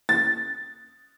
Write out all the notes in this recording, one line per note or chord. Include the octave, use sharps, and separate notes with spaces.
A6